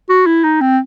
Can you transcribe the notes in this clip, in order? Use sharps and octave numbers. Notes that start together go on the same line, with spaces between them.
F#4
E4
D#4
C4